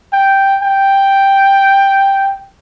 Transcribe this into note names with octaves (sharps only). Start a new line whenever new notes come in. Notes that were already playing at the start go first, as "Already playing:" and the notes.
G5
G5